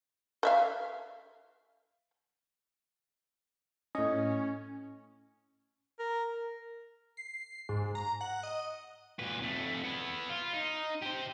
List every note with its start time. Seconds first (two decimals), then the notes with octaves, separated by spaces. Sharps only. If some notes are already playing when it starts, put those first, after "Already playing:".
0.43 B4 E5 F5
3.95 A2 C#4 D#5
5.99 A#4
7.17 C7
7.69 G#2
7.95 A#5
8.21 F#5
8.43 D#5
9.19 A#2 B4
9.41 F2 A3
9.84 B3 E4
10.29 F4
10.53 D#4
11.02 G4 C5